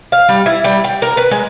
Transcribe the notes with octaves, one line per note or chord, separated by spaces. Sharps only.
F5
G3
E4
G3
G5
A#4
B4
G#3